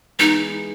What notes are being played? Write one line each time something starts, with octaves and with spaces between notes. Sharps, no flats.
E3 G#3 B3 D#4